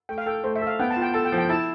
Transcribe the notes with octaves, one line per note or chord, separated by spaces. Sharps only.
A3 G5
F5
A4 G5
A3 C5
E5
A4
F5
B3 G5
A5
F4
G5
A4 A5
G5
F3
G5
E4 A5